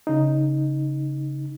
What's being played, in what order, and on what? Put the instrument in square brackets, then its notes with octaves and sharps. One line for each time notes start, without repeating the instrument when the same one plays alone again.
[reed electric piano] C#3 D#4